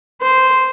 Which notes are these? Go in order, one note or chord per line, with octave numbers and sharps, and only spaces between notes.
C5